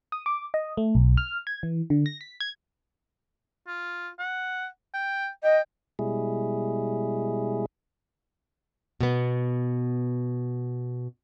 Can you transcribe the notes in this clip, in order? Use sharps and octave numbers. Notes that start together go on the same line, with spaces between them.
D#6
D6
D#5
A3
B1
F6
G#6
E3
D3
A#6
B6
G#6
F4
F#5
G5
D#5 G5
B2 G3 G#3 E4 G#4
B2 B3